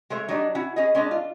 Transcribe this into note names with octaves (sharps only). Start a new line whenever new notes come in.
G#3 A3 C#5 E5
F#3 D4 D#4 G4 B4 D5
C#4 E4 F#4
C#4 G#4 D#5
G#3 C#4 D4 D#5
F4